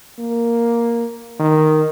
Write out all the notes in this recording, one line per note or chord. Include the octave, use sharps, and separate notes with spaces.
A#3
D#3